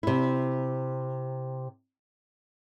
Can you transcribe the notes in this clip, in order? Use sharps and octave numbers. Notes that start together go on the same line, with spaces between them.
C3 E4